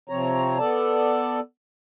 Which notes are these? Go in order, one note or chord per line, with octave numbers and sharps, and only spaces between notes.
C3 F3 C4 C#5 A#5
B3 A4 D5 A5